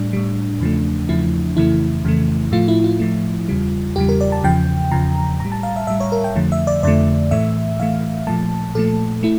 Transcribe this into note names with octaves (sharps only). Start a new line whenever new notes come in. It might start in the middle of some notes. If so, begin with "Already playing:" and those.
Already playing: A2 G3 D4
A2 G3
E2 C#3 F3 A3
E2 C#3 F3 A3 E4
F2 C#3 E3 A3 E4
F2 C#3 E3 A3
A2 F3 A3 F4
E4
F4
A2 F3 A3
E2 C#3 G3
E2 C#3 G3 G4
A#4
D5
A5
E2 C#3 F3 G5
E2 C#3 F3 A#5
A2 G3 A#5
A5
F5
E5
A2 G3 E5
C#5
A#4
G5
F2 D3 F3 A3
E5
D5
F2 D3 F3 A3 D5
A2 E3 A3 E5
A2 E3 A3 F5
A#2 F3 A3 A5
A#2 F3 A3 A4
A3 E4